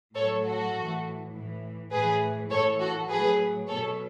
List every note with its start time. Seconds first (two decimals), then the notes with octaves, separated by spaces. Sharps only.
0.15 A2 F#3 A4 C#5
0.44 F#4 A4
0.74 A2 E3
1.32 A2 E3
1.91 A2 E3 G#4 B4
2.50 A2 E3 A4 C#5
2.80 F#4 A4
3.09 A2 F#3 G#4 B4
3.68 B2 F#3 A4 C#5